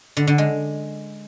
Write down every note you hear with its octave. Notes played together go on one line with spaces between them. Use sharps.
D3
D3
G#3